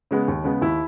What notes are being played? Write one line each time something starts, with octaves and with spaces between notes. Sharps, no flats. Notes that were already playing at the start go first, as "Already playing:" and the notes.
C#3 G#3 B3
D#2
C#3 G#3 B3
D#2 E4